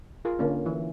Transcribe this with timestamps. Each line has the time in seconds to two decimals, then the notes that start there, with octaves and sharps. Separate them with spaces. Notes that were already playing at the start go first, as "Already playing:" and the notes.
0.25 F4 G#4 A#4
0.39 D3 A#3 C#4
0.66 E3 E4